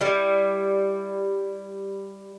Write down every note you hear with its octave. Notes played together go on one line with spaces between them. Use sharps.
G3 E4